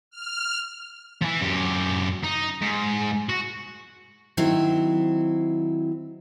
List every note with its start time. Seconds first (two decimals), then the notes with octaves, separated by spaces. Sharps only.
0.10 F6
1.22 E3 F3
1.41 F#2 G4
2.23 D#4
2.61 G#2
3.29 F#4
4.37 D#3 F#3 C4 E4